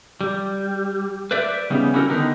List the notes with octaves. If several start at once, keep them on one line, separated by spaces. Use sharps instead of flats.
G3
B4 C5 D5 E5
C#3 G3 B3 C#4 D#4
C#4 E4 F#4 G4 A4 A#4
D3 D#3 B3 D#4